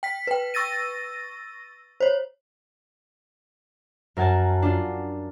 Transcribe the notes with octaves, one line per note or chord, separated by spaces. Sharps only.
G5 B6
B4 G5
C#6 E6 A6 A#6 D#7
C5 C#5
F#2 A#4 F#5 G#5 A5
D4 F4